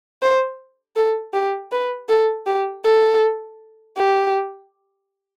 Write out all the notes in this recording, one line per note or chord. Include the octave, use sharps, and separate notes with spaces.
C5
A4
G4
B4
A4
G4
A4
G4